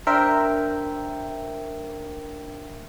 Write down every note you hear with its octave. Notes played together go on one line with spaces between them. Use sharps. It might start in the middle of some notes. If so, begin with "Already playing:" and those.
D4 A#4 C5 E5 G5